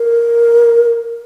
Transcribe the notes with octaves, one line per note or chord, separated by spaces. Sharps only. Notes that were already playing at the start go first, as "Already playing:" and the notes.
Already playing: A#4